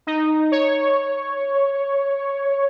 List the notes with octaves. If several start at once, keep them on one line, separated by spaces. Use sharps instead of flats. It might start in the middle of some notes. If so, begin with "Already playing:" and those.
D#4
C#5